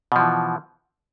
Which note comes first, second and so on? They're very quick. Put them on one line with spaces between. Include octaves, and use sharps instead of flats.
B2 F3 E3